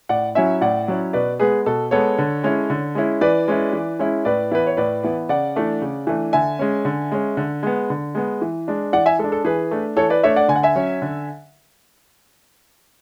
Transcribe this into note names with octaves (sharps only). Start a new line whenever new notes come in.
A2 D5 F#5
F#3 C#4 E4 E5 G#5
A2 D5 F#5
F#3 C#4 E4
B2 B4 D5
G#3 B3 G#4 B4
B2 A4
G#3 B3 A4 C#5
D3
G#3 C#4 E4
D3
G#3 C#4 E4
E3 B4 D5
G#3 C#4 E4
E3
G#3 C#4 E4
A2 B4 D5
E3 B3 E4 B4
C#5
A2 B4 D5
E3 B3 E4
C#3 D5 F#5
E3 A3 D4
C#3
E3 A3 D4
D3 E5 G#5
G#3 C#4
D3
G#3 C#4
D3
G#3 B3
D3
G#3 B3
E3
G#3 D4
E3 D5 F#5
E5 G#5
G#3 A4
D4
A4
E3 G#4 B4
A3 D4
E3 A4 C#5
B4 D5
A3 D4 C#5 E5
D5 F#5
D3 G#5
F#5
E5 G#5
F#3 C#4
D3